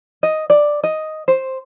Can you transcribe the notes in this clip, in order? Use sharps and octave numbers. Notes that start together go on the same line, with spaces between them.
D#5
D5
D#5
C5